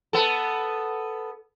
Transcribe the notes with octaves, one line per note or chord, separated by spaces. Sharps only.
B3 A4